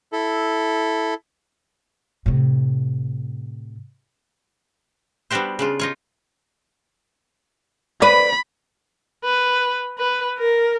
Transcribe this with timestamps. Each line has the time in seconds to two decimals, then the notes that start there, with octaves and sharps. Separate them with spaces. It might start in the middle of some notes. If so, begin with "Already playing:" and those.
0.12 E4 A4
2.26 A2 C3
5.30 G3 B3 D4 F#4 G4 C5
5.59 C#3 D4 F4
5.79 D#4 F4 C#5
8.02 B4 D5 B5
9.24 B4
9.98 B4
10.38 A#4